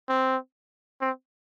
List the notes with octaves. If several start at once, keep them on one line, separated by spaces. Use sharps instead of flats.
C4
C4